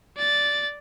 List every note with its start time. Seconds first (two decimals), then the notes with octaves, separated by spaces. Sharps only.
0.16 D5 A6